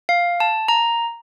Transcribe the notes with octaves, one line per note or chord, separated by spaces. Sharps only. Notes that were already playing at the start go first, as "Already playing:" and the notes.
F5
A5
A#5